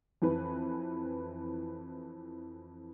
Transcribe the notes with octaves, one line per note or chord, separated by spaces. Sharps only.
F2 E3 B4